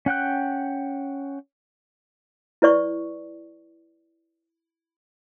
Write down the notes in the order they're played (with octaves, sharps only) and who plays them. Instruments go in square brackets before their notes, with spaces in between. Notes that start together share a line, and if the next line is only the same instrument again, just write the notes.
[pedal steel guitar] C#4 F#5 G5 F#6
[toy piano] E4 B4 D5 C#6